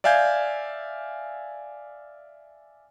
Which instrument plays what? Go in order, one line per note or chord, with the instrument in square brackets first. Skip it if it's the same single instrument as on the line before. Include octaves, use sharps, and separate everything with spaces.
[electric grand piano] D5 E5 F5 G#5 G6 G#6